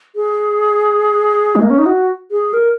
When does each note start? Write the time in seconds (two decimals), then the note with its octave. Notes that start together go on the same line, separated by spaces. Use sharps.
0.16 G#4
1.56 G#3
1.62 A#3
1.70 C#4
1.78 D#4
1.86 F#4
2.31 G#4
2.53 A#4